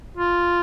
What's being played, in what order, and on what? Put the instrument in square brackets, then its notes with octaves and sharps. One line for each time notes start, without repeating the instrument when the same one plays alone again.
[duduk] F4